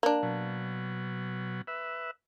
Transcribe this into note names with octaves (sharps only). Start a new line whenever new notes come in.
A#3 D4
B2 F#3
B4 E5